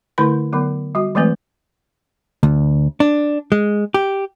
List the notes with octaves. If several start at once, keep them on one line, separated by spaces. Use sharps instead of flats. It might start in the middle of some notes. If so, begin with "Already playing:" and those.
D3 A3 E4 B4 C6
D3 F#3 B3
G3 F#4
E3 F#3 G#3 A3 C4 B4
D2
D4
G#3
G4